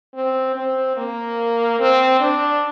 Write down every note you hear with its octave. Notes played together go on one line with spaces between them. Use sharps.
C4
C4
A#3
C4
D4